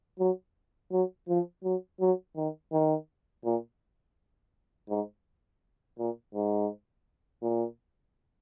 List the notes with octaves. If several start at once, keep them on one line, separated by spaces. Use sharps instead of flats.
F#3
F#3
F3
F#3
F#3
D#3
D#3
A#2
G#2
A#2
G#2
A#2